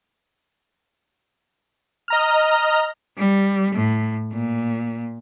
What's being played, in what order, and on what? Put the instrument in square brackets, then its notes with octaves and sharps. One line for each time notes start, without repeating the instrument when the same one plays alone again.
[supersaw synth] D#5 A#5 F6
[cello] G3
A2
A#2